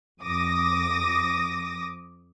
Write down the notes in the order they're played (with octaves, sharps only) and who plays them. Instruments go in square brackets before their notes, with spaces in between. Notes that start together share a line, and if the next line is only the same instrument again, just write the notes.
[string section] F2 D6 D#6 A#6